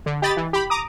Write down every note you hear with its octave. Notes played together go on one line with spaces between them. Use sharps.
D3
G4 D#5 B5 A6
E3
G4 B5
A#5 D6 D#6